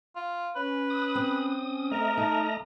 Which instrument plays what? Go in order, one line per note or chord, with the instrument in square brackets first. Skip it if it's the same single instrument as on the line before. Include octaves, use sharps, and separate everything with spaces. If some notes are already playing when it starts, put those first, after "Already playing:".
[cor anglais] F4
[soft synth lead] C#4 [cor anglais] B4
[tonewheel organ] D#6
[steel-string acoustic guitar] C4
[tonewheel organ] A3 D#5 A#5 [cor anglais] A#4
[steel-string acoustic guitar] D#4 [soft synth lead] A5